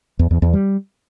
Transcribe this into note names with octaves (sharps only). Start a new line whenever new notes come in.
E2
E2
E2
G3